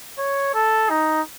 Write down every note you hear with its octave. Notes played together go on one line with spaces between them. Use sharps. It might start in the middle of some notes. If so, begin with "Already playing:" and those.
C#5
A4
D#4